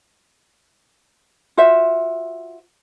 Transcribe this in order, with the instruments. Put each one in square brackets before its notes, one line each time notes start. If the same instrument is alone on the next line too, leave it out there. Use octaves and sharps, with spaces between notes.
[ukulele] F4 F#4 C5 E5